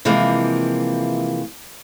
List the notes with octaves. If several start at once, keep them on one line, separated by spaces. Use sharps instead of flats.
C3 E3 F3 G#3 A#3